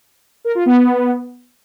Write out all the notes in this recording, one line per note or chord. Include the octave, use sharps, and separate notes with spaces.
A#4
F4
B3